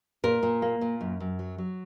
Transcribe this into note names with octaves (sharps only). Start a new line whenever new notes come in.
A#2 A#4
A#2
A#3
A#2
F#2
F#2
F#3
F#3